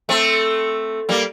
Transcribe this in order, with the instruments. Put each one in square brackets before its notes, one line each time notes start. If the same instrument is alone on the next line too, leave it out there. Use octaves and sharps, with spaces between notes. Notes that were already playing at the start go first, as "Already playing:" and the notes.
[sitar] A3 C4
G3 A#3